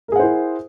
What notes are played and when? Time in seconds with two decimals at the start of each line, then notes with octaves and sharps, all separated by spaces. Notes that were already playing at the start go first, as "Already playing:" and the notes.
0.08 A#4
0.12 G#4
0.16 F#5
0.19 C5
0.23 E4